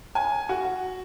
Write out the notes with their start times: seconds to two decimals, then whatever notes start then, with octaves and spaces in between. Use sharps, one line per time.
0.15 G#5
0.49 F#4